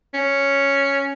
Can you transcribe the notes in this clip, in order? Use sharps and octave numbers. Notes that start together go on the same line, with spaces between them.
C#4